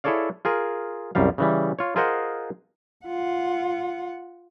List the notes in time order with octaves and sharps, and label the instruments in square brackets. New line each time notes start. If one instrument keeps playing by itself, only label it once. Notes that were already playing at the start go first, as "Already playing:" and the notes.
[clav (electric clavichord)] E4 G#4 A4 C#5 D5 F5
F4 G#4 A#4
C2 F#2 G3 F5
C#3 E3 G3
F4 C#5
F4 G#4 A#4 C5 D#5 F#5
[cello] F4 F#5